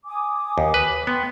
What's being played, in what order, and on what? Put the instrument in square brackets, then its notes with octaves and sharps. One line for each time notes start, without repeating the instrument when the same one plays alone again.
[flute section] G#5 D6 D#6
[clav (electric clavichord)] D#2
B4
[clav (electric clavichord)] B3 [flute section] G5 C6